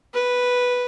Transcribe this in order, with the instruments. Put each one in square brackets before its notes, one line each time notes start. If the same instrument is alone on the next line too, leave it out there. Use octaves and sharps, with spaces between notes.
[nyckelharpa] B4